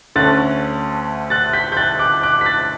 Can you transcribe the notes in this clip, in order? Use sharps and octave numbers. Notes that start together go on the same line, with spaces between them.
D2 D3 A3 C#4 F#6 A6
F#6 A6
G6 B6
G6
F#6 A6
D6 F#6
D6 F#6
B6
F#6 A6